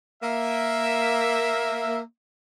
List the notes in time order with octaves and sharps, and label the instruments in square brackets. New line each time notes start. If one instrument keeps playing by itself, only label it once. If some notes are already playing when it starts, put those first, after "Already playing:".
[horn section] A#3 E5